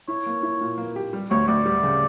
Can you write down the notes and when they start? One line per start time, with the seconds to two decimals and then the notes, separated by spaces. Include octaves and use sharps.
0.08 E4 C#5
0.26 A#3
0.43 E4
0.61 A#2
0.78 A#3
0.96 G4
1.13 G3
1.31 D2 C#5
1.48 D2 D5
1.66 G3
1.83 C#3